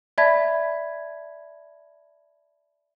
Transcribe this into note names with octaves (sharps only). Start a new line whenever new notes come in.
D5 E5 A5 B5 G#6 B6